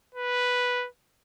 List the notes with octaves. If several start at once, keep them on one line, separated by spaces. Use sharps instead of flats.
B4